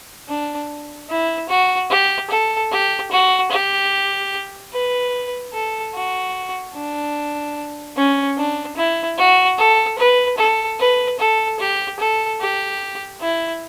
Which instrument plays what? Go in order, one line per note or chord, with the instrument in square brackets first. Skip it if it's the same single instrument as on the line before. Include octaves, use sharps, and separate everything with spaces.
[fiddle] D4
E4
F#4
G4
A4
G4
F#4
G4
B4
A4
F#4
D4
C#4
D4
E4
F#4
A4
B4
A4
B4
A4
G4
A4
G4
E4